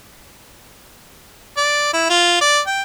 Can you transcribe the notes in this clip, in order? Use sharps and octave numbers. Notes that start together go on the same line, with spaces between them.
D5
E4
F4
D5
G5